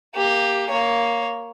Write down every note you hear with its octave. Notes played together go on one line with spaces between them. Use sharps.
A#3 G4
A#3 C#5